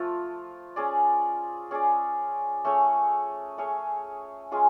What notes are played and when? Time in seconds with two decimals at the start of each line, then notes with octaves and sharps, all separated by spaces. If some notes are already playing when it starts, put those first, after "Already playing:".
Already playing: F3 A3 F4
0.76 C#4 G#4 D5
1.71 C#4 G#4 D5
2.65 A3 C#4 G#4 C#5
3.58 A3 C#4 G#4 C#5
4.52 G#3 C#4 F4 G#4